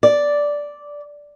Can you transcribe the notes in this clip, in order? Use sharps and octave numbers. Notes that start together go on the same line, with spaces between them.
D5